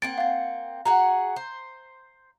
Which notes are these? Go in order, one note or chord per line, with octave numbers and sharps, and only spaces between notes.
A#3 C4 F#5 A6 D7
F5 A6
F#4 G#4 F#5 A#5
C5